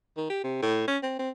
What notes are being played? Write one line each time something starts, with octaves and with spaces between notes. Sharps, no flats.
D#3
G4
C3
A2
C#4
C4
C4